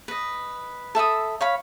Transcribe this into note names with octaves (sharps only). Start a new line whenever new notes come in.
B4 D#5
A4 E5 B5 D#6
C#5 F5 B5